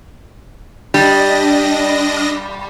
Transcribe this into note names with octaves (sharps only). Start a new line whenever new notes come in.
G3 D4 D#5 A#6